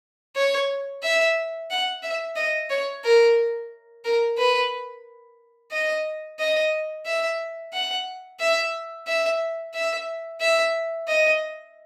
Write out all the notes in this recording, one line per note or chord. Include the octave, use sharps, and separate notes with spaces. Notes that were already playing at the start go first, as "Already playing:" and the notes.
C#5
E5
F#5
E5
D#5
C#5
A#4
A#4
B4
D#5
D#5
E5
F#5
E5
E5
E5
E5
D#5